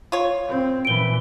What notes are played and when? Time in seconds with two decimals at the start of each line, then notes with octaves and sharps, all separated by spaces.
0.12 F4 C#5
0.48 C4
0.85 A#2 E3 D7 G7